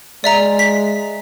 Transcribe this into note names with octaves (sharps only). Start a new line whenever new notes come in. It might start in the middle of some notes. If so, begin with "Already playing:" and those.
G#3 D5 E5 A#5
B6